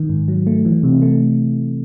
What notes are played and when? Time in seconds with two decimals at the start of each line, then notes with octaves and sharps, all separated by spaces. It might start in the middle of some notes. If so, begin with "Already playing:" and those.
Already playing: D#3
0.09 G#2
0.28 F#3
0.47 A3
0.65 E3
0.83 C3
1.02 A3